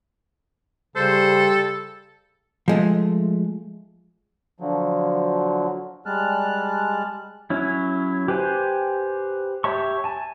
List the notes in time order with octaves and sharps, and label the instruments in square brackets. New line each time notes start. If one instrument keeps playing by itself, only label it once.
[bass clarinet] C#3 [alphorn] G3 [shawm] A4 [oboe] C5
[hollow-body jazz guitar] F3 G#3 A3
[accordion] D3 F3 F#3
G3 G#3 A5 F6 F#6
[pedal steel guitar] F#3 C#4 E4
G4 B4 C5 G#5
G4 C#5 E5 A5 C#6
G#5 A5